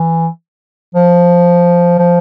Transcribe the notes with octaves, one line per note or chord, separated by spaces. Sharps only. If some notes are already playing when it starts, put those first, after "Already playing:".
Already playing: E3
F3
F3